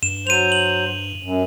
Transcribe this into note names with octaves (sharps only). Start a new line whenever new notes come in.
G2 E7
F#3 C5 D#7 F7
F#7
F#2